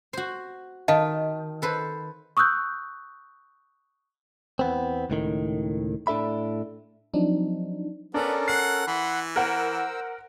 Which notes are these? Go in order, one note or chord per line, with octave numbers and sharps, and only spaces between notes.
F#4 C5
D#3 D#5 F5 A5
A4 B4 C5
C#6 D#6 E6 F#6 G6
E2 B3 C4
C#2 A2 D#3
A2 D4 A4 E5 B5
F3 F#3 C4 D4 D#4
B3 C#4 D4 A4 A#4
F#5 C7
E3 F#5 B5 C6
A#4 C5 F#5 E6